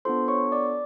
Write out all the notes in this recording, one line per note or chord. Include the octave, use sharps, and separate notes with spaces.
B3 D4 F4 A4 C5 C6
C#5 C#6
D5 D6